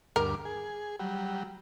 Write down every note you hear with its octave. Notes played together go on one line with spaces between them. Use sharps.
D2 G2 A#4 D6
G#4
F#3 G3